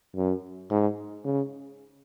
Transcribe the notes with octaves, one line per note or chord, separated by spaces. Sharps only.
F#2
G#2
C#3